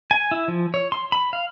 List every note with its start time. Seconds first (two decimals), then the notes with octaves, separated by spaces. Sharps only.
0.11 G#5
0.31 E4
0.48 F3
0.74 C#5
0.92 C6
1.12 B5
1.33 F5